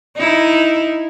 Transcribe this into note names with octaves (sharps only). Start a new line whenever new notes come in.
D#4 E4